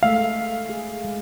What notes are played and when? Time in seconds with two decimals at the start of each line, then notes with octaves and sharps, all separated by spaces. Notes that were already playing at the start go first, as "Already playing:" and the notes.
0.03 G#3 A3 E5 F5
0.69 G#4
1.04 G#3